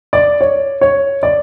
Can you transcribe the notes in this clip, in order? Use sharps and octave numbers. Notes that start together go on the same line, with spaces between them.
D5
C#5
C#5
D5